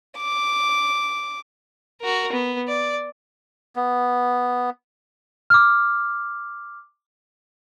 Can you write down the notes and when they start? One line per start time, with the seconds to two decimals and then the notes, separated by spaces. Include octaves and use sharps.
0.17 D6
2.02 F#4 A#4
2.32 B3
2.68 D5
3.76 B3
5.50 D6 F6